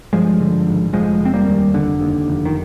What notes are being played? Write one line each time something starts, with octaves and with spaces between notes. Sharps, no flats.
G2 F3 G#3
D3
G#1
F1 F3 G#3
F1 C4
G3 A#3
D#2
F1 D3
D#2
F1
D#3